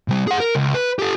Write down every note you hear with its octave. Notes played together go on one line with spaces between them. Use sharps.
C3 G3
G#4 F#5
A#4
C#2
B4
G4 A4